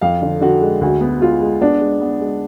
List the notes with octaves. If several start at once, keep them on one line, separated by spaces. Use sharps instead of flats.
F2 F5
D3
D3 F#4
G#3
D2 F#4
B3
G#3 F4
G#3
B3 D4
G#3
B3
G#3